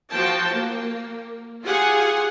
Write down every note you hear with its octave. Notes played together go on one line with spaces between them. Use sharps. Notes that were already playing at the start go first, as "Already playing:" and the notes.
F3 F#4 G5 A5
A#3
F4 G4 G#4 F#5 G#5